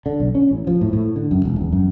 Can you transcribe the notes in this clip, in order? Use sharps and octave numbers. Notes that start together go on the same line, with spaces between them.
D3
B1
C#4
A1
F3
A2
A2
D3
F#2
E1
E2
F#2